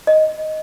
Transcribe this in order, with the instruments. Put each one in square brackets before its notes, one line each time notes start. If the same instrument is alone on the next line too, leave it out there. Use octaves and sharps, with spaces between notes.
[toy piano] D#5